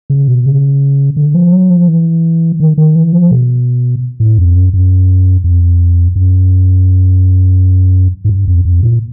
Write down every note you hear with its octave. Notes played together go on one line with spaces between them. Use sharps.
C#3
B2
C#3
D3
F3
F#3
F3
E3
D#3
D#3
E3
F3
B2
A2
F2
F#2
F#2
F2
F#2
G#2
G2
F2
F2
A#2